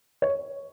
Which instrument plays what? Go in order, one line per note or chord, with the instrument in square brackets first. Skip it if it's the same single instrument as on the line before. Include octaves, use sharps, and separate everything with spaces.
[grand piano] C#5